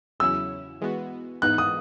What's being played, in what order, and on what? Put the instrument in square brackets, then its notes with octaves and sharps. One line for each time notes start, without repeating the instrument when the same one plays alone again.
[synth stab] E2 C#3 F#3 C#4 E4 [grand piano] E6
[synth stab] E3 G#3 B3 F#4
[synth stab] G#2 E3 B3 D#4 [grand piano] F#6
[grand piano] D#6